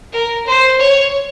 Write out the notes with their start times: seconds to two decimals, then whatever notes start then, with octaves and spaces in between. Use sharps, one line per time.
0.13 A#4
0.46 C5
0.79 C#5